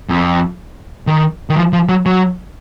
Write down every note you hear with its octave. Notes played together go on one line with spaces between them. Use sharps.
F2
D#3
D#3
F3
F3
F#3
F#3